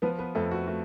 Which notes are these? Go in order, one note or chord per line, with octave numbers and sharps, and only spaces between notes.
F3 B3 B4
B3 B4
F2 A3 A4
F#4
A3 F#4